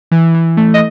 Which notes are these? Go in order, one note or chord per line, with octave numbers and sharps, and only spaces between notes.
E3
E3
A3
D#5